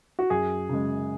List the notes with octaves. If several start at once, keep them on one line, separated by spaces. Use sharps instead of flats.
F#4
F#2 G#4
C#3 G#3